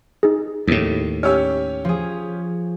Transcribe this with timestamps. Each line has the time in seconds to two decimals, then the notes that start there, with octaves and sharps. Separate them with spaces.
0.23 D#4 G#4
0.67 D#2 A2
1.23 C#4 G4 C#5 E6 F6
1.85 F3 G#4